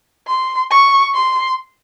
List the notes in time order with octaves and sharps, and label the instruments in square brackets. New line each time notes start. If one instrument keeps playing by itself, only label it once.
[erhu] C6
C#6
C6